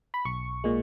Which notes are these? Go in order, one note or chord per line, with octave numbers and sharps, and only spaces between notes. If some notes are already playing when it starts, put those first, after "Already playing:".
B5
B1 C#6
A#2 G#3